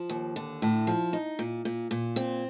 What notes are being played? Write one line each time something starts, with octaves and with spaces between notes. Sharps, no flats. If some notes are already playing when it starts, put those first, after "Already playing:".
Already playing: F3
D#2
D3
A2
F3
D#4
A#2
A#2
A#2
C4